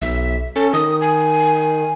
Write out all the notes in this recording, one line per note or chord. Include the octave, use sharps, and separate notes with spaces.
B1 E5
C#4 A4
D#3 D#6
G#5